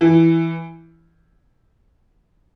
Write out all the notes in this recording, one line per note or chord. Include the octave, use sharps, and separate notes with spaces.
E3